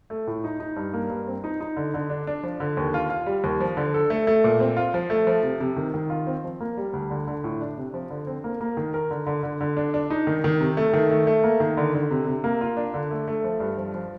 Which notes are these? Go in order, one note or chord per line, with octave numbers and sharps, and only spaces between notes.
A3
A2
D#4
D#4
G2
A#3
G2
C4
D#4
D#4
D3
D3
D4
D4
F3
D3
D#2
F4
F4
G3
D#2
F3
D3
A4
A3
A3
A#2
C4
F4
F3
A3
F3
C3
C3
D#3
D#3
F4
C4
F3
A#3
G3
D2
D3
D3
A2
D4
C3
F3
D3
C4
A#3
A#3
D#3
A#4
D3
D3
D3
D3
D4
D4
D#4
D#3
D#3
C3
A3
D#3
A3
A3
A#3
D#3
D3
D3
C3
C3
A#3
F4
D4
D3
A3
A3
F3
G2
F3
F3